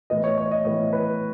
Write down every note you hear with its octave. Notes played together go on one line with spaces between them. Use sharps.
A2 E3 B3 D#5
C#5
C#5
D#5
A2 E3 B3 C#5
B4